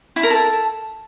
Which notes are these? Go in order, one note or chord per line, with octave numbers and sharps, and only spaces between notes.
E4
A#4
A4